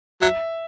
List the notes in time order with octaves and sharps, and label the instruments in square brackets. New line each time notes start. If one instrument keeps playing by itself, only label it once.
[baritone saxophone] F#3 [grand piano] E5